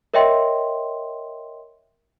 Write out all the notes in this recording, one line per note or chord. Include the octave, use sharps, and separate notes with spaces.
A#4 C#5 D#5 E5 G5 C6